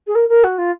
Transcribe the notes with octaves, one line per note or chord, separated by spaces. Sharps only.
G#4
A#4
A#4
F#4
F4